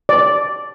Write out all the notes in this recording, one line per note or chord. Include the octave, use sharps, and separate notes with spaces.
D5